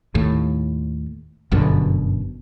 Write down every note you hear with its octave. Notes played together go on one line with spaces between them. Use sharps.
D#2 A2
G1 F#2 B2 D3